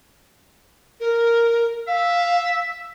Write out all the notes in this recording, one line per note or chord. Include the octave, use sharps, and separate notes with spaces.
A#4
E5 F5